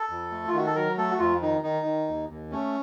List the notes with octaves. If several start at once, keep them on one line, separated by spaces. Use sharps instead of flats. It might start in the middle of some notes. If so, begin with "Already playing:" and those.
Already playing: A4
F2
A3
F4
D#3 F#4
A4
F#3 A#4
A3 A4
F#4
F2 F4
D#3 D#4
D#3 D#4
D#3
D#2
D#2
A3 C#4